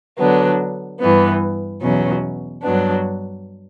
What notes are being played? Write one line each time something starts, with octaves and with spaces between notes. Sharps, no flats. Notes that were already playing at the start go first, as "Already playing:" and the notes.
D3 F#3 B3 D4
G2 E3 B3
E2 B2 F#3 C#4
G2 F#3 B3 D4